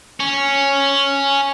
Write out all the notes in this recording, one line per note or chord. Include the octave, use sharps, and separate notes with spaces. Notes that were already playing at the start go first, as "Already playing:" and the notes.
C#4